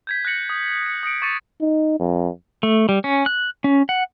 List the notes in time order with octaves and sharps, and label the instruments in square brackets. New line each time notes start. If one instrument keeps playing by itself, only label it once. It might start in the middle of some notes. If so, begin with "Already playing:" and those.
[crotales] G6 G#6 B6
F#6 G6 A#6 C#7 F#7
D#6
C#7
D#6 A#6 C#7 D7
C#6 D6 A6 C#7 D#7
[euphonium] D#4
F2
[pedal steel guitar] A3
G3
C#4
F#6
C#4
F#5